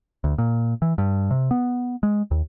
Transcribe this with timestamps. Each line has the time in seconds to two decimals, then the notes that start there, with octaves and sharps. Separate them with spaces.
0.24 D2
0.38 A#2
0.82 E3
0.98 G2
1.31 C3
1.51 B3
2.03 G#3
2.31 D#2